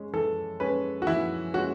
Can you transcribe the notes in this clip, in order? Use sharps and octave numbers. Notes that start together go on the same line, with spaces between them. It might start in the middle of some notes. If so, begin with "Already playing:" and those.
Already playing: G#3 C#4
E3 A4
G#3 C#4 B4
F#4
E3 E4
G#3 C#4 F#4